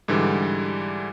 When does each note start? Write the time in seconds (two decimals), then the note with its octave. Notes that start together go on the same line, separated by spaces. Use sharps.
0.08 G#2 D3 E3 G3